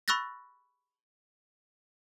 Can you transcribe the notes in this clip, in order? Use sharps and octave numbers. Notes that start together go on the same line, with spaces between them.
B5 C#6 E6 F#6 A6 A#6